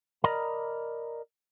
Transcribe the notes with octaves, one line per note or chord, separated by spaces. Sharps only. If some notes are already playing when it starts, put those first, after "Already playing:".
A#4 D5 D#5 A#5 B5